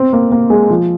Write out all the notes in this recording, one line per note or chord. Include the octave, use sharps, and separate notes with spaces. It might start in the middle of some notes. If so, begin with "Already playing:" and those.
Already playing: C4
A#3
A#3
G#3
F3